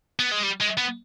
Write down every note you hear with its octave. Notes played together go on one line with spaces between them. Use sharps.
B3
G#3
G3
G#3
B3